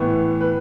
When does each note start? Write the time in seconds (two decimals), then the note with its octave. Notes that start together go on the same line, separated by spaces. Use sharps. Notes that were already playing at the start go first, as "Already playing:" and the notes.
Already playing: A2 E3 B3
0.41 B4